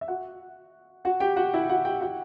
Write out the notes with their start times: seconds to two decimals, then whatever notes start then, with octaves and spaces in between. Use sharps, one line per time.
0.01 E5
0.08 F#4 F#5
1.05 F#4 F#5
1.20 G4 G5
1.36 F#4 F#5
1.54 E4 E5
1.69 F#4 F#5
1.85 G4 G5
2.01 F#4 F#5